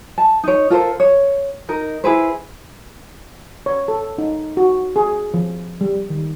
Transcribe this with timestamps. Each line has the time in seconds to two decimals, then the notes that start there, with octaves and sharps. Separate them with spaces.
0.18 A5
0.44 D#4 C#5
0.70 F4 A4 A#4 C5
1.00 C#5
1.69 D#4 A#4
2.04 E4 G#4 B4 C5
3.66 C#5
3.88 A4
4.18 D#4
4.57 F#4
4.96 G#4
5.34 F3
5.81 G3
6.10 D#3